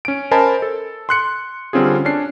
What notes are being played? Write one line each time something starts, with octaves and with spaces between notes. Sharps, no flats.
C#4 D7
A#4 C5 D#5 G#5 A5 B5
A4
C6 F#6 C#7
D3 G3 C4 C#4 F4 G#4
C#4 D4 C7